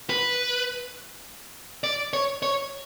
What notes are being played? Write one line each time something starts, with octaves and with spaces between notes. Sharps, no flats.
B4
D5
C#5
C#5